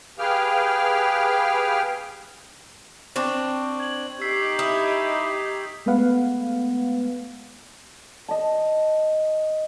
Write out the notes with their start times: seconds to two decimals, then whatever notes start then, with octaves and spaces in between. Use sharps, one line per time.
0.19 G4 G#4 B4 F5 G5 F6
3.16 C4 D4 C#6
3.80 G#6 F#7
4.21 D#4 G4 E6 B6 C7
4.59 E4 D#6
5.86 G#3 A3 B3 B4 F5 F#5
8.28 D#5 A5